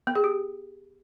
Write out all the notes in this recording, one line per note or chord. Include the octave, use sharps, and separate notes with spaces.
B3
G#4
G4